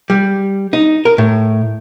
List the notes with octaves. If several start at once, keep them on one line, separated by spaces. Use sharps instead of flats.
G3
D#4
A#4
A2